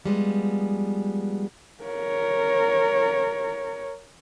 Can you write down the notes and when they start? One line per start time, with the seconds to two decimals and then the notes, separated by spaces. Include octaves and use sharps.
0.04 F3 G3 G#3 B3
1.84 A#4 C#5